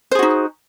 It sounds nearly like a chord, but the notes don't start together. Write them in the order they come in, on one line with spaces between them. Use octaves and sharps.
C5 G#4 F#4 D#4